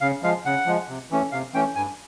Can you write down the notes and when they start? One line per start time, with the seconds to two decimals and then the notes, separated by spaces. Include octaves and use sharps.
0.01 C#3 F5
0.23 F3 G#3 F5
0.45 C#3 F#5
0.66 F3 G#3
0.88 C3
1.11 E3 A3 C#4
1.32 C3 F5
1.54 E3 A3 C#4 G5
1.75 G2 G#5